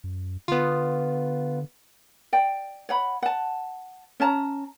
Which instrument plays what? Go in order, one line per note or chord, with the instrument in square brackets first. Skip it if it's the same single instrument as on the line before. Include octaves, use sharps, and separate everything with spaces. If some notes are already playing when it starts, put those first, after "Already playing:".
[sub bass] F#2
[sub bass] D3 [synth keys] B3 F4
[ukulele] D5 G5
C#5 F#5 B5
F#5 A5
C#4 C#5 A5 A#5